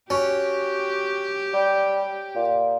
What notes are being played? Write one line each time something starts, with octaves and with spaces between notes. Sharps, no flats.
C#4 F#4 G4
G3 G5
A#2